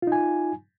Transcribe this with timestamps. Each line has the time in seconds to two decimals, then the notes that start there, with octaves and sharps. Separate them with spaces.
0.02 F4
0.07 D#4
0.12 G#5